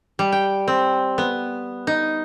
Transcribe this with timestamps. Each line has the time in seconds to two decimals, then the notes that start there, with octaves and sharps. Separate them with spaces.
0.19 G3
0.32 G5
0.68 C4
1.18 B3
1.87 D#4